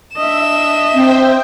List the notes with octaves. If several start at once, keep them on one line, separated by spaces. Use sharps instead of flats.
D4 D#5 E5 E7
C4 C5 E5 G5